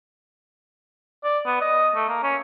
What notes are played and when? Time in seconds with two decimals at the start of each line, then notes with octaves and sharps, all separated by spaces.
1.24 D5
1.46 B3
1.61 D#5
1.95 A3
2.09 A#3
2.23 C#4